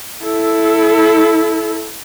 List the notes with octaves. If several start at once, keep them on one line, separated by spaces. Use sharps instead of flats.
E4 A4